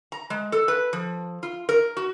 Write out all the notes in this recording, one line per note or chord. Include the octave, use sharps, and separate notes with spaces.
A#5
G#3
A4
B4
F3
F4
A#4
F#4